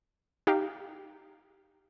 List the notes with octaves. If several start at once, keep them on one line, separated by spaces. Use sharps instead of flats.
D#4 G4 F5